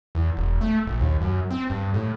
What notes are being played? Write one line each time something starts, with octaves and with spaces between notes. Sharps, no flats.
E2
E1
A3
A#1
D#2
F#2
C4
G2
A2